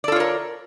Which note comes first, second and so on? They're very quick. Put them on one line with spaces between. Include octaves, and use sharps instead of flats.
D5 A4 F4 C#5 A#4